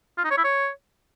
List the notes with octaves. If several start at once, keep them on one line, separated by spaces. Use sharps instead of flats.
F4
D#4
C#5
E4
C#5